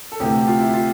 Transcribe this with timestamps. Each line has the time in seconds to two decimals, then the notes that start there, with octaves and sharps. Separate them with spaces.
0.12 A4
0.20 D2 C3 E3 G4
0.47 F4
0.60 E4
0.73 F4